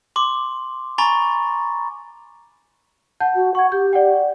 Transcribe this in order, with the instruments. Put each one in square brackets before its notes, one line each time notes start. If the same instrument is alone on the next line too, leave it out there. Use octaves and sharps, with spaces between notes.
[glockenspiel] C6 D6
G#5 A#5 B5 C#6 A6
[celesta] F#5 A5 G6
[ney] F#4
[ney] F#5 [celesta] C#6 G#6
[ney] G4 [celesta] G6
[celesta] D5 F#5 G5